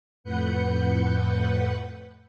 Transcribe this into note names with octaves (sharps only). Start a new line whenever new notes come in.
F2 A2 B4 F#5 G6 C#7